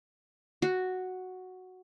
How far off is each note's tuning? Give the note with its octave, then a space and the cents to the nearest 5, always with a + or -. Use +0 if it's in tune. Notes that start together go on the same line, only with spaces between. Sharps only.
F#4 +0